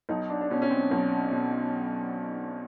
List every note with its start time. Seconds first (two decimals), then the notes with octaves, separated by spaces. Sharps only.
0.09 B1 D#4
0.30 D4
0.41 D4
0.50 B2 C#4
0.62 C#4
0.70 C4
0.91 B1
1.32 B2